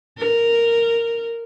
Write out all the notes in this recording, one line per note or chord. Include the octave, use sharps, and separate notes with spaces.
A#4